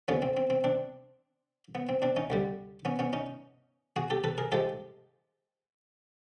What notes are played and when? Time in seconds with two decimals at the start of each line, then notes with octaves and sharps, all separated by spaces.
0.08 D#2 D3 F3 B3 C#4
0.22 C4
0.37 C4
0.50 C4
0.64 C4 D4
1.75 B3
1.89 C4
2.02 C4 D4
2.16 C#4 D#4
2.30 D2 D3 G3
2.85 B3 C#4
2.99 B3 C#4
3.13 C#4 D#4
3.96 F#4 G#4
4.10 G4 A4
4.24 A4 B4
4.38 G#4 A#4
4.52 F3 G#3 G4 A4